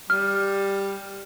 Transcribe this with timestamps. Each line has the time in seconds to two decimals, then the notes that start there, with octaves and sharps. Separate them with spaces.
0.10 G3 F6